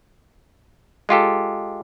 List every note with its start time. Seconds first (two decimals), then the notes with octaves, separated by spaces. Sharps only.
1.09 G#3 F4 G4 A4